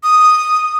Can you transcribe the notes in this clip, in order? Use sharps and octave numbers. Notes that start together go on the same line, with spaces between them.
D#6